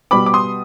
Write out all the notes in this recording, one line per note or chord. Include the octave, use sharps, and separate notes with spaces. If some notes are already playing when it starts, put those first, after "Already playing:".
B2 G3 B3 B5 D6
D6
C6 D#6